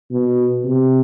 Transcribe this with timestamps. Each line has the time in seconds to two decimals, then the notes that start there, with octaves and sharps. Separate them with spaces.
0.11 B2
0.64 C3